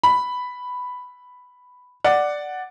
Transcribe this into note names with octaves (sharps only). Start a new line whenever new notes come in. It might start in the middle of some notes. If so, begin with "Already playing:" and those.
B5
D5 F#5